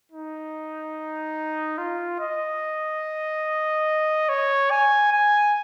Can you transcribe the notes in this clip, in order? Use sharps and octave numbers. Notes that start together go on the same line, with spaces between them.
D#4
F4
D#5
C#5
G#5
G#5